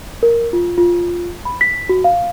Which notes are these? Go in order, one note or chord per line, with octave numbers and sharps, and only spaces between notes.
A#4
F4
F4
B5
B6
F#4
F5